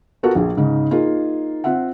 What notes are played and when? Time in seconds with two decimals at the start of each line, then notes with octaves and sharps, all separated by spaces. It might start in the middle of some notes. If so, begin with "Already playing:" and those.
0.23 B3 F4 F#4 A4 A#4
0.35 A#1 G#4
0.57 G#2 C#3 D#4
0.91 A#3 D#4 F4 G#4
1.64 C4 F4 E5 F#5